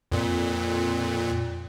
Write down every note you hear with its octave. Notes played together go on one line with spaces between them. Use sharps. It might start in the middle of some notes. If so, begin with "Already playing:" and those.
F2 A#2